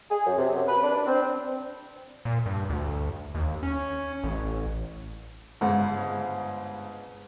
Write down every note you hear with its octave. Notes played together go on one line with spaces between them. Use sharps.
G#4
F#2
C3
F#2
B4
D4
D4
C4
A#2
G2
D2
D#2
C#4
A1
G1 G#2 C#3 G#3